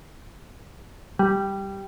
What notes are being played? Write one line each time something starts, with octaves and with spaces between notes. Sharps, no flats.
G3